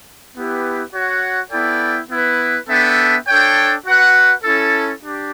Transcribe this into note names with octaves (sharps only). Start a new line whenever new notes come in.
B3 E4 G4 B4
F#4 C#5 F#5
B3 E4 A4 D5 G5
B3 E4 B4
B3 D4 A4 E5 G5
D4 A4 C#5 G5
F#4 B4 F#5
C#4 E4 A4
D4 G4